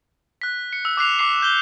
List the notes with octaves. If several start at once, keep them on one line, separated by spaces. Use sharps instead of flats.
F#6 B6
C#7
E6
D6 F#6 C7 F7
D6 C7
G6 G7